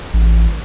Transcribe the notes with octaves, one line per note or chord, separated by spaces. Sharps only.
A1